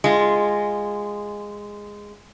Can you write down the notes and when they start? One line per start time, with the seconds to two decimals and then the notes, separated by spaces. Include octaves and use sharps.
0.04 G#3 F4